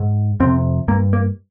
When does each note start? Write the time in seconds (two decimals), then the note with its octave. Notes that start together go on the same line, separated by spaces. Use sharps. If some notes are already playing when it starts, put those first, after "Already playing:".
Already playing: G#2
0.40 F2 C3 C4
0.88 G2 A#3
1.13 A#3